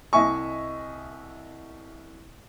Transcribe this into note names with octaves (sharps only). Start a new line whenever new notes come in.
C2 D#5 E5 G#5 C#6